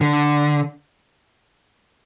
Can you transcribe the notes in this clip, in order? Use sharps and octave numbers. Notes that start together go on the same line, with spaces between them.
D3